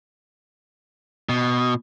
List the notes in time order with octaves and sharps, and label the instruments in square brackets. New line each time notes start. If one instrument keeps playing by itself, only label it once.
[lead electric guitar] B2